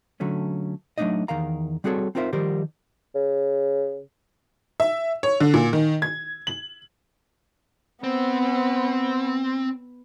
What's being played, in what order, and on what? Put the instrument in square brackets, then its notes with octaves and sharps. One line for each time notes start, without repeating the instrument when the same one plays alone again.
[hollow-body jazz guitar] D3 F#3 A3 C#4
F#3 A3 A#3 D4 D#4 D#5
E2 D#3 A#4 F5 A#5
G3 C4 F#4 G#4 A4 C#5
C4 D#4 F4 A#4 C5 E5
D#3 F3 G3 G4 A#4 C5
[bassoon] C#3
[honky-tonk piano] E5
C#5
D3
A#2
D#3
G#6
F#7
[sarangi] B3 [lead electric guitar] C4